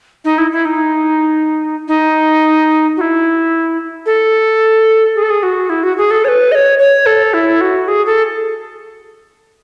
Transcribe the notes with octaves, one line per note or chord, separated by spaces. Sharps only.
D#4
E4
E4
D#4
D#4
F#4
E4
A4
G#4
A4
G#4
F#4
E4
F#4
G#4
A4
C#5
B4
D#5
C#5
C#5
A4
E4
F#4
G#4
A4